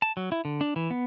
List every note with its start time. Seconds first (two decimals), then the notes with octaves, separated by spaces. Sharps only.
0.02 A5
0.17 F#3
0.32 E4
0.45 D3
0.61 D4
0.76 E3
0.91 B3